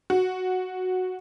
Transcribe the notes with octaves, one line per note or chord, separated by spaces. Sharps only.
F#4